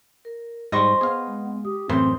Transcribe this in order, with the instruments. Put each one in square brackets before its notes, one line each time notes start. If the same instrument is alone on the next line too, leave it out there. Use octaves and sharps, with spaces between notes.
[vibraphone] A#4
[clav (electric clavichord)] G#2 G3 [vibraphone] C5 [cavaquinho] D#5 C6 C#6
[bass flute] B3 [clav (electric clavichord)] G#4 F5
[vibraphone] G#3
[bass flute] G4 [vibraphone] D#6
[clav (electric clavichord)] F#2 A2 E3 [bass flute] C4 [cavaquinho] C5 C6